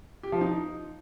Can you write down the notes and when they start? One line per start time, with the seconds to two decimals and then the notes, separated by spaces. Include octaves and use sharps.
0.23 G4
0.32 F3
0.41 D#4